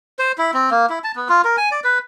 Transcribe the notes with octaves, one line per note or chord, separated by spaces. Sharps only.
C5
E4
C4
A#3
E4
A5
B3
F4
A#4
G#5
D5
B4